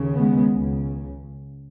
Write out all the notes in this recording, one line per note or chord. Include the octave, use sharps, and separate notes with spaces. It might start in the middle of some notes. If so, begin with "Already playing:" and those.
Already playing: D#2 C#3
G#3 B3
C#2 C#3